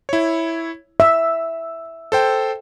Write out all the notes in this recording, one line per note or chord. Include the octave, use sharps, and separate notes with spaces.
E4 C#5
E5 E6
A4 C5 G5